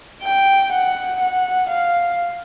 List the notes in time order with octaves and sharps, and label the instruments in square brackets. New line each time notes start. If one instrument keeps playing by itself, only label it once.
[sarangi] G5
F#5
F#5
F5